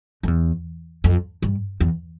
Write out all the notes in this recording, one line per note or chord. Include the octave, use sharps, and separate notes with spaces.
F2
E2
F2
G2
E2